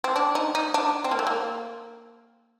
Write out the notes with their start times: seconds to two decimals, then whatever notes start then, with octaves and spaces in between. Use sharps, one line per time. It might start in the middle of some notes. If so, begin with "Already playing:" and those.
0.04 C4
0.16 D4
0.35 D#4
0.55 D#4
0.74 D4
1.04 C4
1.11 A#3
1.19 A3
1.27 A#3